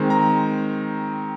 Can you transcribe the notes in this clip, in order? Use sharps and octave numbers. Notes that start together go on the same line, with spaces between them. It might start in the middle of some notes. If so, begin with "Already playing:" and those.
Already playing: D#3 G#3 C4
A#5